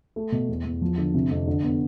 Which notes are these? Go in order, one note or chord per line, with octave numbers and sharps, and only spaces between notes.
A3
B2
E2
E2
F3
D3
C3
F2
D3
B3